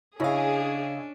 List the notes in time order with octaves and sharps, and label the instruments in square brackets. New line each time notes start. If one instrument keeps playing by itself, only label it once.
[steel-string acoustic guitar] C#3 F5 [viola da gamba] C#4 D4 [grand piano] E4 C#5 D#5 [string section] G#4